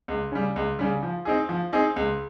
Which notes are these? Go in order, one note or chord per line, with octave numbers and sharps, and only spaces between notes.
C#2
C#3 G3
C#2
C#3 G3
F3
C4 D#4 G#4
F3
C4 D#4 G#4
C#2